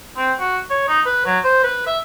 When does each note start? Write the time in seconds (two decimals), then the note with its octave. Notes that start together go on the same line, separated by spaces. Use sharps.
0.17 C4
0.40 F#4
0.70 C#5
0.88 D#4
1.06 B4
1.26 F#3
1.44 C5
1.64 B4
1.87 E5